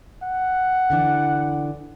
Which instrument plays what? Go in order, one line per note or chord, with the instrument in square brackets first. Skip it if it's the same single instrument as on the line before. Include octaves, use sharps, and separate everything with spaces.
[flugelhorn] F#5
[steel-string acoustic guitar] D3 E3 D4